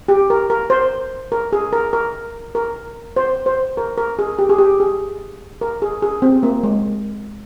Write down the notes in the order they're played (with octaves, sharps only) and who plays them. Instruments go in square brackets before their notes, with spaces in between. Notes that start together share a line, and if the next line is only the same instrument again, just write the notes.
[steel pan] G4
A#4
A#4
C5
A#4
G#4
A#4
A#4
A#4
C5
C5
A#4
A#4
G#4
G4
G#4
G4
G#4
A#4
G#4
G#4
C4
A#3
G#3